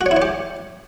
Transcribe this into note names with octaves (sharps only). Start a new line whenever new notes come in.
F#4
C#5
E4
C#5
G4